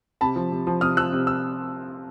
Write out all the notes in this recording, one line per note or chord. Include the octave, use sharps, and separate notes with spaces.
C3 A5 B5
F3
C3
F3
C3 D#6 F6
F3 E6 F#6
C3
E6